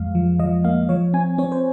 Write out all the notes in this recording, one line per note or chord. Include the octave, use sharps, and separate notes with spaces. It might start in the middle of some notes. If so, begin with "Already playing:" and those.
Already playing: F2 G#3 F5
F3
F3 D#5
A#3 F5
F3 C#5
C4 G#5
C4 C#5
C5